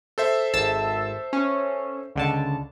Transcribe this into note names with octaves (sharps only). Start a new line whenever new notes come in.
A4 C5 E5
G#1 A5 E6
C#4
C#2 D3 A5